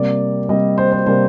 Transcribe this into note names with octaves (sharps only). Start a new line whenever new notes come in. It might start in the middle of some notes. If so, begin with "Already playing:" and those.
Already playing: C3 G3 A#3 D5
C3 G3 A#3 D#5
C5
C5
C3 G3 A#3 C5